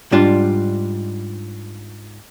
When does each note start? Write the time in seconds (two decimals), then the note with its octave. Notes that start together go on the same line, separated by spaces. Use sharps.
0.12 G#2 G3 D4 F4